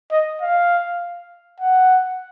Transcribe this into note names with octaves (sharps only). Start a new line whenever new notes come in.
D#5
F5
F#5